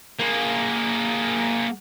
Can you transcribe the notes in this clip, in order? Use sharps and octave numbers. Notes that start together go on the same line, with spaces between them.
A#3 G#4